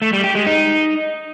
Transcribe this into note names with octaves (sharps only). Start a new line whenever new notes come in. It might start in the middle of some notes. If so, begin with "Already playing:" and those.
A3
G3
G4
G#3
D#4